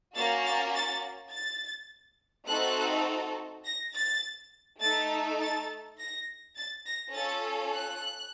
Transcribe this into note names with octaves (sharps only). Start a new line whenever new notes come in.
A#3 C#4 F#4 A6
A6
A6
A6
A3 C4 D#4 F#4 A4 F#6
A#6
A6
A3 D#4 A4 A6
A6
A#6
A6
A#6
C#4 F4 A4 A6
F#6